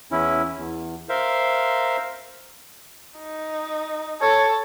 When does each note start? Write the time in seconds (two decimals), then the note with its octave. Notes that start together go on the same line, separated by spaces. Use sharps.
0.11 E2 C#4 E4
0.58 E2
1.09 A#4 C5 E5 F5
3.19 D#4
4.21 A4 C#5